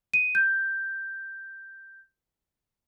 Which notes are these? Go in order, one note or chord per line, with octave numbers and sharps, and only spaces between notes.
D#7
G6